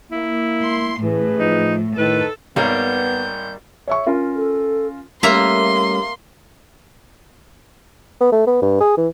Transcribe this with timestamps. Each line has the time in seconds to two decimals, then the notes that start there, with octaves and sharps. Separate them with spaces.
0.11 A#3 E4
0.64 C6
1.03 A1 A2 E3 G#4 B4
1.40 F3 D#4
1.98 A2 D#3 A4 B4
2.56 G#1 G3 A#3 B3 A#4 C#5 G6
3.88 C#5 E5 C#6
4.06 C#4 F4 A#4
4.36 A4
5.23 G3 A3 A#3 C#4 E5 A#5 C6
8.20 B3
8.32 A3
8.47 B3
8.62 G2
8.80 G#4
8.97 E3